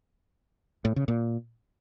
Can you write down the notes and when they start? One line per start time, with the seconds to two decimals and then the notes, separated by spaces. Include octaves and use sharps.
0.85 A2
0.96 C#3
1.08 A#2